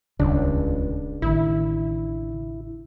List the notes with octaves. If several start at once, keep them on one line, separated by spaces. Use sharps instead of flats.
D#1 C#2 C#3 D4
A1 D#3 E4